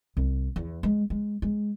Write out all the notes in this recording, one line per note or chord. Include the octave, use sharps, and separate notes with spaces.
C2
E2
G#3
G#3
G#3